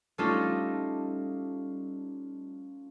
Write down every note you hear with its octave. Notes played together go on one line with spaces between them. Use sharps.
G3 A3 C#4 D#4 F4 A4